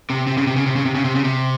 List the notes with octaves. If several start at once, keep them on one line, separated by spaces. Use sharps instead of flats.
C3
C3
C#3
C3
C#3
C3
C#3
C3
C#3
C3
C#3
C3